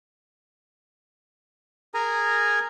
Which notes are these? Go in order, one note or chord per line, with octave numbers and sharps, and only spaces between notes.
G#4 A#4 G#5 A#5